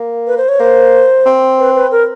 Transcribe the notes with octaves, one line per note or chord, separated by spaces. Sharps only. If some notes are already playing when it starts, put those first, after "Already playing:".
Already playing: A#3
B4
C5
C#5
A#3 C5
C4
B4
B4
A#4